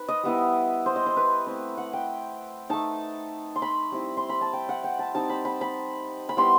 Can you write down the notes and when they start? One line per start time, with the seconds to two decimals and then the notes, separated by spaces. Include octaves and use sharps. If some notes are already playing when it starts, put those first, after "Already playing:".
Already playing: C4 D#4 B4
0.08 D#5
0.23 G3 B3 E4
0.86 C5
0.96 D#5
1.06 C5
1.17 B4
1.46 A3 C4 E4
1.78 F#5
1.93 G5
2.69 A3 D#4 A5
3.56 C6
3.62 B5
3.92 G3 C4 E4
4.17 C6
4.29 B5
4.41 A5
4.53 G5
4.69 F#5
4.84 G5
4.99 A5
5.14 G3 C4 D#4 A5
5.30 B5
5.45 B5
5.61 B5
6.29 B5
6.37 G3 B3 E4 C6